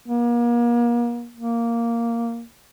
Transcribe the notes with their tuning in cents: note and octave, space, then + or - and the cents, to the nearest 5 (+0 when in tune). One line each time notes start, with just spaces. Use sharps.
A#3 +35
A#3 -5